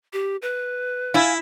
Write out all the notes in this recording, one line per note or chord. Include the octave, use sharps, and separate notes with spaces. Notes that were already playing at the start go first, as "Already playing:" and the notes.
G4
B4
E4 F4 E5 G#5